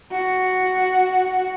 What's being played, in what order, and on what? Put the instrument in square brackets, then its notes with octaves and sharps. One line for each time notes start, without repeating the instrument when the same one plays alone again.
[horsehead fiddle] F#4